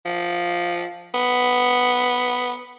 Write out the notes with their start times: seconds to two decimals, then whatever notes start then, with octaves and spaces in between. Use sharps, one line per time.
0.05 F3
1.14 B3